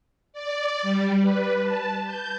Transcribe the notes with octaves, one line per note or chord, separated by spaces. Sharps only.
D5
G3
B4
A5
G6